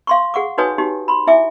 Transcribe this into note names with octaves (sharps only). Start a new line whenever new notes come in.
F5 C6 C#6
G#4 F#5 C#6 D6
D#4 F#4 B4 C#5 G#5 D#6
D#4 F#4 G4
B5 C6
E4 E5 G#5 D6